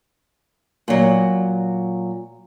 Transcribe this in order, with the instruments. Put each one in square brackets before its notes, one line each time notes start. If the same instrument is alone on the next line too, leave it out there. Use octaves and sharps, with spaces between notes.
[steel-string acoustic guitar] A#2 F#3